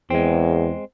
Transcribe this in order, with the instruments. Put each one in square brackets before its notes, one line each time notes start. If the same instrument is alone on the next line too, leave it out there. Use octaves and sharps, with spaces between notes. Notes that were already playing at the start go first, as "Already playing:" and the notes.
[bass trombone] E2 [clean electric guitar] G#3 C4